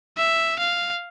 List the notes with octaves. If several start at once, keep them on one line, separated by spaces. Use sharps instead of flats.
E5
F5